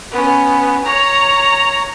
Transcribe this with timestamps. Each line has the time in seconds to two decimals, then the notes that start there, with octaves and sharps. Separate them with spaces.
0.12 B3 C#4
0.85 C#5 A#5